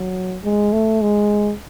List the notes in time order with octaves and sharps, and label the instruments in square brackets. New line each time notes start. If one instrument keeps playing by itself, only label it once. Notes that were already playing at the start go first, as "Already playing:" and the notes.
Already playing: [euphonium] F#3
G#3
A3
G#3